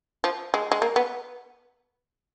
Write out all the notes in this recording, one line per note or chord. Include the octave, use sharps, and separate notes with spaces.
F3
G#3
G#3
A#3
B3